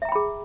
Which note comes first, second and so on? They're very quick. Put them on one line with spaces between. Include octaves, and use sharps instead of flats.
E5 A#5 G5 B5 G#4